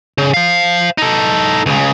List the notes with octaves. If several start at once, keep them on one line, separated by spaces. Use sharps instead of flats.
C#3
C5 F5
D#4 A4
C#2 C#3